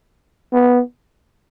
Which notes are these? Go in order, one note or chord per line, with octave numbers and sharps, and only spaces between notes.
B3